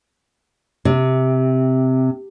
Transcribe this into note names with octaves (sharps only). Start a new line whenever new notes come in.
C3